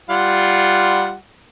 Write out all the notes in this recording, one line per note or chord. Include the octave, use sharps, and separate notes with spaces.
G3 F4 F#5